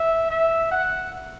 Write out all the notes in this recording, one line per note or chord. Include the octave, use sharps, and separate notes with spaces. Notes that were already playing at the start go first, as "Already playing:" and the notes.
Already playing: E5
E5
F#5